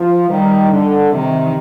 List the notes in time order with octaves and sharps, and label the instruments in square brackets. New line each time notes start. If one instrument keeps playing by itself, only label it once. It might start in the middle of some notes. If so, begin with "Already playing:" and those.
Already playing: [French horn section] F3
[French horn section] D#3 [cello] G3
[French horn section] D3
[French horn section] C3 [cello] D#3